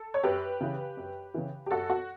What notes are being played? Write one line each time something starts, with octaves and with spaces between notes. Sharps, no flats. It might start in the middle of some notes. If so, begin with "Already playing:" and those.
Already playing: A4
C#5
F#2 G4 B4
C#3 E3
F#2
C#3 E3
G4
F#2 F#4 A4
F#4